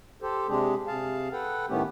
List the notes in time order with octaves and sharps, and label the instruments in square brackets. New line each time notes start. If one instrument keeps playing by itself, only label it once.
[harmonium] G4 A4 C5
C3 G#3 D4 G4 G#4
C3 G#4 F5 A5
A4 B4 F#5 G5
A2 D#3 A3 B3 C#4 G4